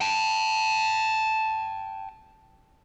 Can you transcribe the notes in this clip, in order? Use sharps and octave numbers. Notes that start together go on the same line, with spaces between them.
G5 A5